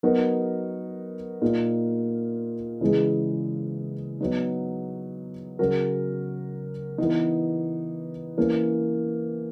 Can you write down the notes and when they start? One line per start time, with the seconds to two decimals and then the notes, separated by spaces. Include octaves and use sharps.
0.03 F#3 B3 D#4 F#4 A#4
1.42 A#2 A#3 D#4
2.81 C#3 E3 G#3
4.21 F#3 B3 D#4
5.59 C#3 F#3 C#4 F#4 A#4
6.98 E3 B3 D#4
8.37 E3 A#3 C#4